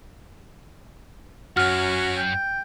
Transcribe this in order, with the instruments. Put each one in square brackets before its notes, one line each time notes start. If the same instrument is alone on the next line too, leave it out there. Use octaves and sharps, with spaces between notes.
[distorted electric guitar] F#2 [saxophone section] C#4 F#4 [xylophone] F6
[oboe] G5